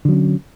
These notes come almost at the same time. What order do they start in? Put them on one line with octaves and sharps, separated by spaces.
D3 F#3 C#4